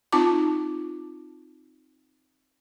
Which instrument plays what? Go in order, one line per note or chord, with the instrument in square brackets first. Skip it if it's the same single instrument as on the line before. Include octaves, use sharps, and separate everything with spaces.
[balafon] C4 D#4 F4 A5 D6